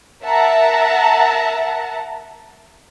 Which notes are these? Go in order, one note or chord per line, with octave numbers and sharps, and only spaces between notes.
A#4 E5 F#5 A5 A#5